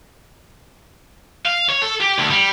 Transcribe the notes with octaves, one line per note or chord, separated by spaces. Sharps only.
F5
C#5
A4
G4
D2
G3